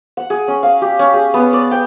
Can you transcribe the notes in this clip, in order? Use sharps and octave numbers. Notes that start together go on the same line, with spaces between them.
F#5
G#4
C#4
F5
G4
C#4
G#4
B3
D5
G5